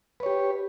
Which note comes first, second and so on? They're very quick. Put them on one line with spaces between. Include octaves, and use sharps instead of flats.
B4 C#5 G4